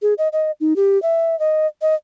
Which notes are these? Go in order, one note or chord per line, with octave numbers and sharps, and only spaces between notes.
G#4
D#5
D#5
D#4
G4
E5
D#5
D#5